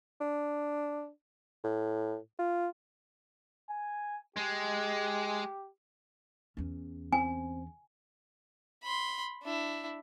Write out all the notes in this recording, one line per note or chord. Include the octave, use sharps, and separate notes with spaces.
D4
A2
F4
G#5
G#3 G4
E2 C#4
C4 G#5
B5 C6
D4 E4